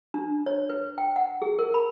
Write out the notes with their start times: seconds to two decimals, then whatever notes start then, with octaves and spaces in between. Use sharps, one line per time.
0.14 D4
0.46 C#5
0.69 B4
0.98 G5
1.16 F#5
1.42 G#4
1.59 A#4
1.74 B5